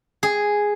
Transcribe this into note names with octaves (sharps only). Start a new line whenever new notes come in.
G#4